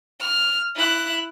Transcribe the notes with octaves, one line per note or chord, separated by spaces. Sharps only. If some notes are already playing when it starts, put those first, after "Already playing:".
F6
E4 F#6